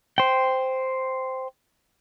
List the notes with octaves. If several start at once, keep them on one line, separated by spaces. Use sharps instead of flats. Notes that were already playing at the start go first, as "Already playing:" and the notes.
C5 G5